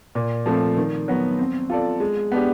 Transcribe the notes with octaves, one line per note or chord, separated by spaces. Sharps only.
A#2
F3 A3 C4
D#3
F#3 B3
C4
F4 A4 D5
G#3
B3 D4 G4